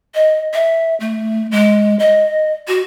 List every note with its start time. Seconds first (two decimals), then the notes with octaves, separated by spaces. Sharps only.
0.15 D#5
0.54 E5
1.00 A3
1.52 G#3
2.00 D#5
2.68 F#4